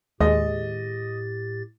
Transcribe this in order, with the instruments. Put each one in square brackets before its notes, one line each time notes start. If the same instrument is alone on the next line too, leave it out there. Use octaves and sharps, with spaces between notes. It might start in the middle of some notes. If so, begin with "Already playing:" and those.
[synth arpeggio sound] D#2 [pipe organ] A2 G4 A6 [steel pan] G#3 [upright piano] D#5